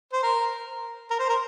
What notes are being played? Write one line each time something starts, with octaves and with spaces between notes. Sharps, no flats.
C5
A#4
A#4
C5
A#4